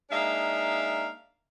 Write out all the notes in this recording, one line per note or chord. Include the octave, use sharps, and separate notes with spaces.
G#3 A#3 D4 D#4 E5 F5